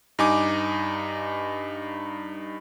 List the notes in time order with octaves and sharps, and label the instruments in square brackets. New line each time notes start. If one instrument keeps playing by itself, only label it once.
[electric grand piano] G2 D#4 G#5 D6